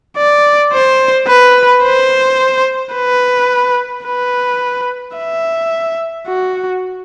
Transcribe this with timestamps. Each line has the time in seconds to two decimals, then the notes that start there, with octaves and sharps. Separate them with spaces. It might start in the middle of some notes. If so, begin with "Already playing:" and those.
0.17 D5
0.73 C5
1.28 B4
1.84 C5
2.95 B4
4.06 B4
5.17 E5
6.28 F#4